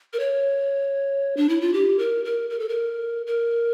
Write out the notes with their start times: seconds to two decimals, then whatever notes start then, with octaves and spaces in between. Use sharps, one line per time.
0.13 A#4
0.20 C#5
1.37 D4
1.49 E4
1.61 F4
1.74 G4
1.99 A#4
2.25 A#4
2.50 A#4
2.60 A4
2.69 A#4
3.27 A#4